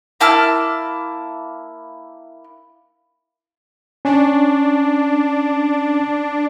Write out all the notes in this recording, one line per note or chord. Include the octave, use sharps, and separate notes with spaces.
A#3 E4 A5 F6
C#4 D4